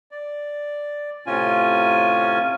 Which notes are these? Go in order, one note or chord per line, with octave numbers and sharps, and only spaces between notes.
D5
A2 C3 C#4 F4 G#5